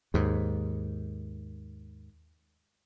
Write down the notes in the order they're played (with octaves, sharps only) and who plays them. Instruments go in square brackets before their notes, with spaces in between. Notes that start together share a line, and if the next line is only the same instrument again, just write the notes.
[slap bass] D#2 G#2